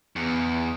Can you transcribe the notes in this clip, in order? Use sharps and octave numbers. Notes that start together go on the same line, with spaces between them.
E2